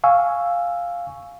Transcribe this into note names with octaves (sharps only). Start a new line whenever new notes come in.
F5 G#5 C#6 E6